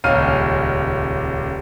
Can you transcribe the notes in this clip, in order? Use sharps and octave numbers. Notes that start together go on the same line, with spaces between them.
D#1 C#2 C#4 F5 F6 D#7